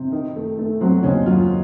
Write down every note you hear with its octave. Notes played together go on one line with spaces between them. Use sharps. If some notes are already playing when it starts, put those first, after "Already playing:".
Already playing: C3
D#3
A3
A3
F#3 C4
D#2 C#4
F#3 F4